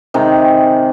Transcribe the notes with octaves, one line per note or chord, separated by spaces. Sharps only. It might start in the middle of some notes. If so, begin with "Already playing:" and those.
C3 D#3 G#3